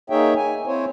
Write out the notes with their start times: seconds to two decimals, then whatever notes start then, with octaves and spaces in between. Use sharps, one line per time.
0.10 A#3 D#4 G#4 C#5 E5 G5
0.36 G#5
0.66 C4 E4 C5 C#5